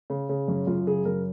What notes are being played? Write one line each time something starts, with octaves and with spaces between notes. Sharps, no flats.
C#3
C#3
F#2 C#4
F#2 F4
C#3 G#4
F#2 A#4